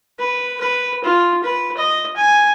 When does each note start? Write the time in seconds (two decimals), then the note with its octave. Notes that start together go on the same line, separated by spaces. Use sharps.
0.19 B4
0.60 B4
1.04 F4
1.43 B4
1.77 D#5
2.16 G#5